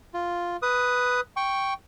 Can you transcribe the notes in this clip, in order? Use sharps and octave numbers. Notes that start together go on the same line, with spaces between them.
F4
B4 D#6
G5 C#6